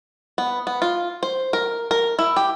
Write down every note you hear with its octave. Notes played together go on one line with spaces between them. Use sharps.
B3
B3
F4
C5
A#4
A#4
E4
G4